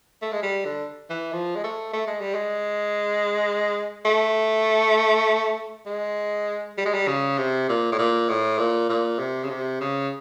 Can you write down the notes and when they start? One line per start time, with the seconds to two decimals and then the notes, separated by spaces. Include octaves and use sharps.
0.22 A3
0.32 G#3
0.43 G3
0.65 D3
1.10 E3
1.33 F3
1.56 G#3
1.64 A3
1.93 A3
2.07 G#3
2.21 G3
2.34 G#3
4.05 A3
5.86 G#3
6.78 G3
6.86 G#3
6.94 G3
7.08 C#3
7.38 C3
7.69 A#2
7.92 A2
7.99 A#2
8.29 A2
8.59 A#2
8.90 A#2
9.19 C3
9.44 C#3
9.50 C3
9.81 C#3